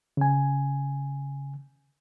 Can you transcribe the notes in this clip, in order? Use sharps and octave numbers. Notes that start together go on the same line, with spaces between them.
C#3 G#5